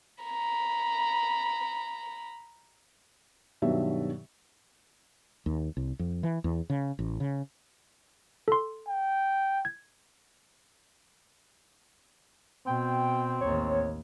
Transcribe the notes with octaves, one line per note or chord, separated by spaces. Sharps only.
A#5 B5
G2 B2 D#3 F#3 E5
D#2
C2
F2
E3
E2
C#3
A1
C#3
A4 C6
G5
G#6
B2 C4 G5
A1 D#2 C#5